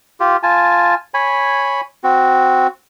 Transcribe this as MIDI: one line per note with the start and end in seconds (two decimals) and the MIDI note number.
0.20 0.37 65
0.20 0.37 67
0.43 0.95 65
0.43 0.95 80
0.43 0.95 81
1.14 1.81 73
1.14 1.81 80
1.14 1.81 83
2.04 2.67 60
2.04 2.67 66